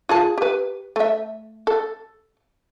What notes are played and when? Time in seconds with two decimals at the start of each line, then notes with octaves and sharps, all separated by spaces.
0.09 F4 G#4 A5
0.38 G4 B4
0.96 A3 E5
1.67 A4